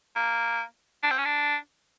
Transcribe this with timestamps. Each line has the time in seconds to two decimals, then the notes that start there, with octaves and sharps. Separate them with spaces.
0.16 A#3
1.03 D4
1.11 C4
1.18 C#4
1.25 D4